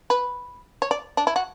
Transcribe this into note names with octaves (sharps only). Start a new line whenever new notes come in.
B4
C#5
D5
D4
E4
F#4